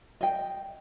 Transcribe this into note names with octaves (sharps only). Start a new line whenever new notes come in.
D#5 G5